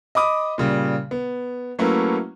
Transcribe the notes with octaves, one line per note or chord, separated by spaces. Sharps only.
D#5 B5 D6 D#6
A#2 C#3 G3
B3
F#3 A3 A#3 C#4 E4 B4